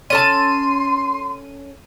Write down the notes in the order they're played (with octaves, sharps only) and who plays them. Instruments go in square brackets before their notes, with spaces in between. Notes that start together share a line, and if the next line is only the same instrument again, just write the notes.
[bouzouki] C#4 A4 A5 [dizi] C6 [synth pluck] D#7